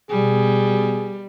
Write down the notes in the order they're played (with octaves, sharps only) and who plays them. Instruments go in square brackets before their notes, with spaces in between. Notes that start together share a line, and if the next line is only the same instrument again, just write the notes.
[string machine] B2 [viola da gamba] G3 [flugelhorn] G#4